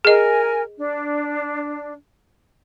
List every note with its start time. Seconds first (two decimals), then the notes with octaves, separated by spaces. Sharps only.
0.05 G#4 A#4 D#5 G#5
0.78 D4